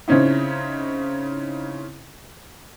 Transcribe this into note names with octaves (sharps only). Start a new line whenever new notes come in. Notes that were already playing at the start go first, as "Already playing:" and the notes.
C#3 C4 C#4 D#4 E4